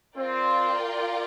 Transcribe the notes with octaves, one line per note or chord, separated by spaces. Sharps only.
C4 F4 A#4 D5 G5